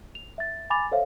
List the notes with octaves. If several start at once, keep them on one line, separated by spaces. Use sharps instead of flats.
F7
E5 A6
G#5 B5 D6 A6 F7
A4 C5 C#5 E5 F5